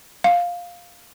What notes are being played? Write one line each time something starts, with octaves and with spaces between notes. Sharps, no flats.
F5